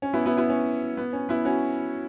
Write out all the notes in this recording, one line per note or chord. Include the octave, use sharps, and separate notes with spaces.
C#4
B3 E4
B3 E4
B3 E4
C#4
B3
C#4
B3 E4
C#4 F#4